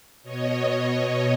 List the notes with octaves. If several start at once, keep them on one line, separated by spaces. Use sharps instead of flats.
B2 C#5 D#5